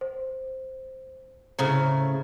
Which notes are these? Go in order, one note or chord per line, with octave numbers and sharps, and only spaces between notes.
C5
A2 C#3 C5 A#5